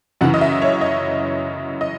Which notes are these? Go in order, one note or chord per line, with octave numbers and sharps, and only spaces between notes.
F#2 C#3 E3 F#5
D#5
E5
C#5
D#5
D#5